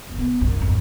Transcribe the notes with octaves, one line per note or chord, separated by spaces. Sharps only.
E1
B3
C2 F#2
G#1 F2